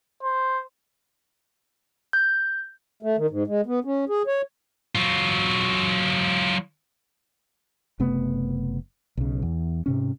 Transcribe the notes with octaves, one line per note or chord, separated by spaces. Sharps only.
C5
G6
A3
D#3
G#2
G#3
B3
C#4
G#4
C#5
F#3 F4
F#1 C3 A3 B3
B1 C#3
E2
G#2 C3 C#4